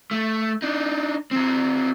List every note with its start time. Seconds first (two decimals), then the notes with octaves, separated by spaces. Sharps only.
0.11 A3
0.62 D4 D#4
1.31 F#3 C4